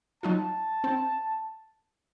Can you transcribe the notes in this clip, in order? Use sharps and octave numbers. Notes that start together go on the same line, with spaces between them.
F#3 D#4 F4 A5
C4